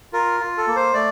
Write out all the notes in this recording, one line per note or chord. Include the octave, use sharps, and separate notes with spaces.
F4 A#4
F4
A4
A#3
C5
A3 D5